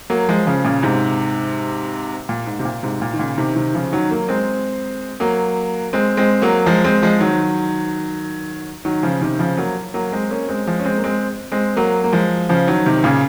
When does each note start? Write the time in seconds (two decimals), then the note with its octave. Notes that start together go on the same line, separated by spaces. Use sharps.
0.10 F#3 A#3
0.29 F3 G#3
0.47 C#3 F3
0.64 A#2 C#3
0.83 G#2 C3
2.29 A#2
2.46 G#2
2.59 C3
2.65 A#2
2.83 G#2 C3
3.02 A#2
3.13 D#3
3.19 A#2 C#3
3.38 C3 D#3
3.56 C3 D#3
3.75 C#3 F3
3.93 D#3 F#3
4.11 F#3 A#3
4.29 G#3 C4
5.20 F#3 A#3
5.93 G#3 C4
6.17 G#3 C4
6.42 F#3 A#3
6.66 F3 G#3
6.84 G#3 C4
7.02 F3 G#3
7.20 D#3 F#3
8.85 D#3 F#3
9.03 C#3 F3
9.21 C3 D#3
9.39 C#3 F3
9.57 F#3 A#3
9.94 F#3 A#3
10.12 G#3 C4
10.31 A#3 C#4
10.48 G#3 C4
10.67 F3 G#3
10.79 C#4
10.85 G#3 C4
10.98 A#3
11.04 G#3 C4
11.52 G#3 C4
11.77 F#3 A#3
12.04 A#3
12.13 F3 G#3
12.49 C#3 F3
12.67 D#3 F#3
12.86 C3 D#3
13.04 A#2 C#3